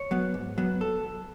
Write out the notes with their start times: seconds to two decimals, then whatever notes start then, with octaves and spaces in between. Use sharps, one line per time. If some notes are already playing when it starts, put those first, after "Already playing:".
Already playing: C#5
0.11 F#3 B3
0.34 G#2
0.58 F#3 B3
0.81 A4